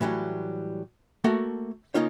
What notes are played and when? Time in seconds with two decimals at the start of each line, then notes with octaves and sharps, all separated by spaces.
0.01 A2 E3 F#3 G3
1.24 A3 A#3 F#4 A4 F#5
1.94 C#3 A#3 D#4 F4 C#5